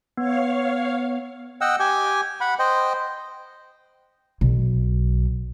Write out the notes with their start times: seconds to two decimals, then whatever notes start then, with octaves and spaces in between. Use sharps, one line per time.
0.17 B3 C#5 F5
1.61 D#5 F#5 G5 E6
1.80 G4 G5 G#5
2.41 F#5 B5
2.59 C5 D#5 G5
4.41 B1